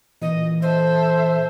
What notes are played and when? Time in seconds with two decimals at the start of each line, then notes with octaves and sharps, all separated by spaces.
0.22 A#2 E3 D#5
0.62 A4 C5 E5